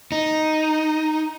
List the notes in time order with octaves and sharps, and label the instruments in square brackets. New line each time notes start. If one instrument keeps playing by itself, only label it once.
[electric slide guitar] D#4